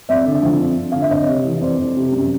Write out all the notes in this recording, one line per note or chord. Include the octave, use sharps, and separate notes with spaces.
F2 D5 E5
D3
F3
F2
F2
D3 F5
E5
F2 C#5 D#5
C3
E3
F2 C5 D5
F2
C3
F#2